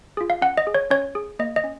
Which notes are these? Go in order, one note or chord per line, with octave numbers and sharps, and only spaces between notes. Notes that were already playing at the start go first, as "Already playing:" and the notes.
F4 G#4
F5
C#4 F#5
D#5
G#4
C#5
C#4 C#5
G#4
A#3 D#5
D#5
C#4